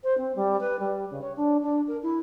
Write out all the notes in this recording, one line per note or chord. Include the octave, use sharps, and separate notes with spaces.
C5
C4
G3
B4
G3
C#3
C#5
D4
D4
A#4
E4